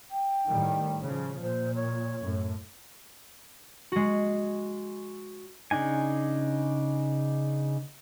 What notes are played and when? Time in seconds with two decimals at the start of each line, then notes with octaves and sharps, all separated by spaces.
0.11 G5
0.48 A2 D#3 G3
1.02 C#3 F3
1.42 A#2 C5
1.75 C#5
2.26 F#2 A2
3.92 G#3 F#4
5.71 C#3 D4 D#4 G#5